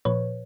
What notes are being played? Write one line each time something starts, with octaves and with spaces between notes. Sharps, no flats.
A#2 F3 B4 C#5